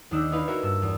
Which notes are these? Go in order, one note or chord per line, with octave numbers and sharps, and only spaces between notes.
D#2 D#3 D4 D#4 E6
D#4 E4 B4 F5 B5
F#4 A#4 C#5 E5
G2 E6
E2